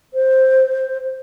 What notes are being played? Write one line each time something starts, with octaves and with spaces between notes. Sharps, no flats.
C5